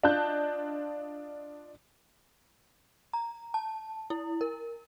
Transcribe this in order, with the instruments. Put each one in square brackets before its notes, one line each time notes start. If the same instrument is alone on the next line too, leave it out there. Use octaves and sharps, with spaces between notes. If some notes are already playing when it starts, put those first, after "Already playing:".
[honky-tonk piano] D4 F4 D#5 A5 F#6 G6
[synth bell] A#5
A5
E4
A#4